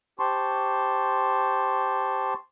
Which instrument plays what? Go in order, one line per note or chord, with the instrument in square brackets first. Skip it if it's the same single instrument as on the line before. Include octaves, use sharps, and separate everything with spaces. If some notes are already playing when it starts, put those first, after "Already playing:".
[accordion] G4 C5 A5 C6 C#6